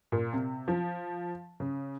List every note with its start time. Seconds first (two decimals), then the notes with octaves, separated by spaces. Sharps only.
0.12 A#2
0.33 C3
0.68 F3
1.60 C#3